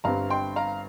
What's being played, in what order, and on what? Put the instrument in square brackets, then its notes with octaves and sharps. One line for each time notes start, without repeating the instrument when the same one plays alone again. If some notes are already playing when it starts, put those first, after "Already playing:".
[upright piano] G1 G2 G3 C4 F5 A#5
G5 C6
F5 A#5